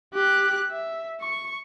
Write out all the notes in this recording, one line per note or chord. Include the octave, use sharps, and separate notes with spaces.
G4 F#6
E5
C#6